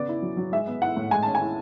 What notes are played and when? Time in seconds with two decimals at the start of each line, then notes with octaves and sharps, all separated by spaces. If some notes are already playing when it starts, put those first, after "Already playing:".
Already playing: C#3 B3 D5
0.09 E4
0.22 F#3
0.37 F#3
0.52 G#3 E5
0.67 B3
0.82 E4 F#5
0.96 A2
1.11 G#3 G#5
1.23 C#4 A5
1.35 G#5
1.41 E4